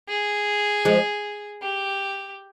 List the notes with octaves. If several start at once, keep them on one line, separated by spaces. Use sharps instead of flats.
G#4
F3 G#3
G4